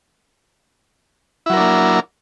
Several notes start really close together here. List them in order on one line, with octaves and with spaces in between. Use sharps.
E4 F#3 A#4 D4 A#3